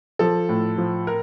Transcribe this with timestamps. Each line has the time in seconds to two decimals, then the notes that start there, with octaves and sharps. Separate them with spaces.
0.19 F3 A4
0.49 A2
0.78 F3
1.07 A#4